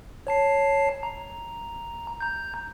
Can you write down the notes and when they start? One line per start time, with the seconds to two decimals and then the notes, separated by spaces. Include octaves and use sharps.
0.27 C#5 A5 C7
1.03 A#5
2.21 A#5 G6